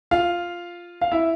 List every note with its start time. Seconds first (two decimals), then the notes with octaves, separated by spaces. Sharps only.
0.11 F4 F5
1.01 F5
1.11 E4 E5